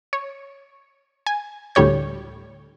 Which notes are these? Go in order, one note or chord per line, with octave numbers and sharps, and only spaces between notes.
C#5
G#5
D2 A2 G3 C#5 G6